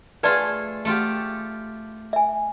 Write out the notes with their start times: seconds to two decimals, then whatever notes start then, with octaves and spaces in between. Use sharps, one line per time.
0.23 A3 F4 G#4 B4 D5 A5
0.85 A3 F4 G4
2.13 E5 G#5